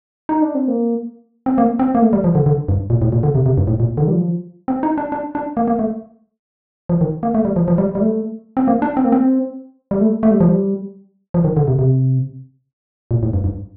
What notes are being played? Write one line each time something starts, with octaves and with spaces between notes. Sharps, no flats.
D#4
D4
C4
A#3
C4
A#3
C4
A#3
A3
G3
F3
D3
D3
G2
A#2
A2
A#2
D3
C3
C3
G2
A2
A#2
D3
D#3
G3
F3
C4
D#4
D4
D4
D4
A#3
A#3
A3
F3
D#3
A#3
A3
G3
F3
F3
G3
G3
A3
C4
A#3
D4
C4
A#3
C4
G3
A3
A3
G3
F3
G3
F3
D#3
D3
C3
C3
A#2
A2
G2
G2